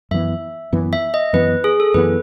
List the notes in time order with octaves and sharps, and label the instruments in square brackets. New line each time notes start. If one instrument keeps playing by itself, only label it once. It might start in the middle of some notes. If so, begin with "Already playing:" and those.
[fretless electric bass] F#2 E3 B3 [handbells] E5
[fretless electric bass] F#2 E3 B3
[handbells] E5
D#5
[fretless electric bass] F#2 E3 B3 [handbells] B4
[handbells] G#4
A4
[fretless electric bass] F#2 E3 B3 [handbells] B4